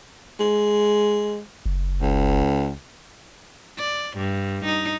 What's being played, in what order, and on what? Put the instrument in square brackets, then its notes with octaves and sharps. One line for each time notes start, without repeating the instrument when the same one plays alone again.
[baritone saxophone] G#3
[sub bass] F#1
[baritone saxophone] C#2
[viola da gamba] D5
G2
D#4